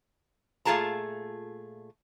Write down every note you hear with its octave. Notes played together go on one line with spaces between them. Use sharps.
A#2 A3 F4 G#4 A5 A#5